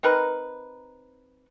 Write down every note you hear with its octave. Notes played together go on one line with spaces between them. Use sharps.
C4 D#4 A#4 B4